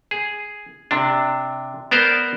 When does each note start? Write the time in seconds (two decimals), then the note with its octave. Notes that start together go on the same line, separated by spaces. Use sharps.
0.11 G#4
0.91 C3 D4
1.91 B3 A#4 C5 D5